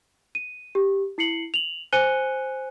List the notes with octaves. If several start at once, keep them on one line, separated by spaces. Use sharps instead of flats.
D#7
G4
E4 C7 C#7 F#7
F7 F#7
C5 G#5 F#6 C#7 D#7 G7